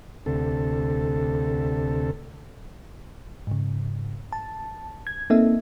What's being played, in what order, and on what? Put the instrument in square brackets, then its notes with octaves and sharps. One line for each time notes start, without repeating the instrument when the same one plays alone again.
[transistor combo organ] D2 C3 A4
[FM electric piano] G#2 C#3
A5
G#6
A#3 C4 D#4 A4 E5